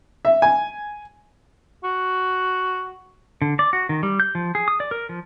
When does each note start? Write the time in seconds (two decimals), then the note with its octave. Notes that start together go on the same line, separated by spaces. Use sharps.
0.25 E5
0.42 G#5
1.84 F#4
3.42 D3
3.59 D5
3.73 F#4
3.89 D#3
4.03 G3
4.20 G6
4.35 F3
4.55 G#4
4.68 D#6
4.80 D5
4.91 A#4
5.09 F3